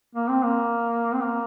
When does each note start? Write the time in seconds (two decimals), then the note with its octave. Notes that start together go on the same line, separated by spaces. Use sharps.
0.15 A#3
0.28 C4
0.43 A#3
1.14 C4
1.22 A#3